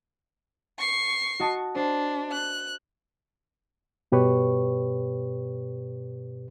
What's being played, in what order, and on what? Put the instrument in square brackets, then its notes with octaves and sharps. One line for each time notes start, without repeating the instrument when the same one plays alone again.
[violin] C#6 C7
[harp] F#4 D#5 A5
[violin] D4 [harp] C5
[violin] F#6
[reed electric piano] G2 B2 G4 B4 C#5 C#6